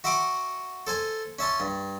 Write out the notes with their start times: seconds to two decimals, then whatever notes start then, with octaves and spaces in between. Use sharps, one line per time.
0.04 F#4 E5 F#5 C6 D6
0.87 A4 C5 G#5
1.39 C#4 E5 A5 C6
1.60 G2